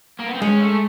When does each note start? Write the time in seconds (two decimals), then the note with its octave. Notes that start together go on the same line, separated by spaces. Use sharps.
0.20 A#3
0.27 B3
0.35 C4
0.42 G#3 C#4
0.61 A3